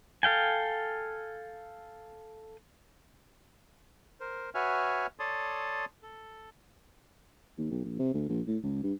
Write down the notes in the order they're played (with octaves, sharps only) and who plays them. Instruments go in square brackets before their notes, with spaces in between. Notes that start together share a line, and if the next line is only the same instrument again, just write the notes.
[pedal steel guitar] A4 F5 G5 G#5
[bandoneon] A#4 C5
F#4 B4 C#5 E5 G#5 F6
A4 C#5 D5 A5 C6 D#6
A4
[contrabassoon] D#2
B1
A#1
C3
D2
A#1
A2
C#2
G2